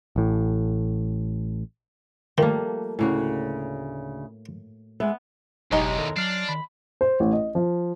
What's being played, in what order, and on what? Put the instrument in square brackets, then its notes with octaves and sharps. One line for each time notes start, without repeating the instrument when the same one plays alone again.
[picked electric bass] A1 A2
[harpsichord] D#3 [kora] F3 G3 A#3 [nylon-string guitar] A3 F5
[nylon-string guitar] D2 C#3 [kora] A2 A#3 F#4
[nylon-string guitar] G#3 E5 [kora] B3
[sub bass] F#1 [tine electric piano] B1 G4 [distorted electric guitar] E2 B2 [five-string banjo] G#3 D#4 C#5
[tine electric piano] D#3 A4 A#5
[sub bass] F#3 [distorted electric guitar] D4 [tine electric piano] F6 C7
[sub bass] D#3 [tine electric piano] B5
[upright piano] C5
A1
D#5
F3